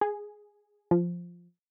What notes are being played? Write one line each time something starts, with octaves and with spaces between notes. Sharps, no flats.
G#4
F3